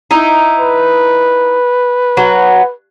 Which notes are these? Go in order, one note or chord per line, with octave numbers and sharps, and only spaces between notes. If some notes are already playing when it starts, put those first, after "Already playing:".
D#4 E4
B4
F#3